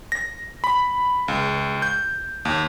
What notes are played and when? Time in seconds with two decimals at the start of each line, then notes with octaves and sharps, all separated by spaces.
0.12 A#6
0.64 B5
1.28 C#2
1.82 G6
2.45 D#2